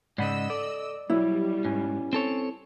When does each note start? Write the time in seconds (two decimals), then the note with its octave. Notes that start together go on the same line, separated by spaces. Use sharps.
0.18 G#2 C#3 D5 D#5 F#5 B5 E6
0.50 A4 D5
1.10 B2 F#3 G3 E4
1.65 G#2 C#4 G#5
2.13 C4 A4 C#5